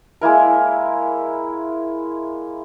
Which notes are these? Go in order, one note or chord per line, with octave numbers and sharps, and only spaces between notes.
G#3 A#3 E4 A#4